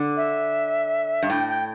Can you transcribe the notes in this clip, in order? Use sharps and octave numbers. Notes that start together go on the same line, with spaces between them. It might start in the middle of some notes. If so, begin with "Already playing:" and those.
Already playing: D3
E5
G2
A2 G5
G5